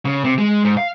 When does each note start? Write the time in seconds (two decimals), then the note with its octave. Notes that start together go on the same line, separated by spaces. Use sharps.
0.06 C#3
0.24 C3
0.38 G#3
0.65 G#2
0.77 F5